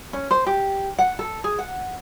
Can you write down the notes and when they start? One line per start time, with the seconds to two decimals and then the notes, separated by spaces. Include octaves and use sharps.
0.13 C#4
0.31 C5
0.47 G4
0.98 F#5
1.19 A4
1.44 G#4
1.59 F#5